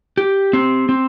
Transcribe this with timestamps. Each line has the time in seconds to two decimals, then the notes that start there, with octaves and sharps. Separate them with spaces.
0.17 G4
0.53 C4
0.89 C4